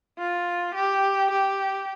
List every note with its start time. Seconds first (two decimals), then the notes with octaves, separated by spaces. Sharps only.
0.18 F4
0.74 G4
1.30 G4